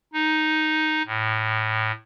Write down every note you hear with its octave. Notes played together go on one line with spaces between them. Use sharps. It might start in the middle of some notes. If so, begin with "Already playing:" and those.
D#4
A2